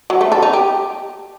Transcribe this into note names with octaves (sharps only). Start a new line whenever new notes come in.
F#3
A3
A4
D#4
G4